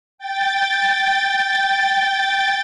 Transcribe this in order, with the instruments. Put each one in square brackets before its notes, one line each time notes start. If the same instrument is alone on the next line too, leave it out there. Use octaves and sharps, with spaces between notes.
[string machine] G5 A6